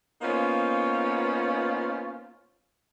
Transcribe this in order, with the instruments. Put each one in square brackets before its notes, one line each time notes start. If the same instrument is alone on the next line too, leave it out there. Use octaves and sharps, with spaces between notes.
[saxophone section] A#3 B3 C#4 D#4 F4 C5